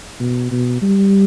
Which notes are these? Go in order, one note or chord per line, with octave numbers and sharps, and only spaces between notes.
B2
B2
G3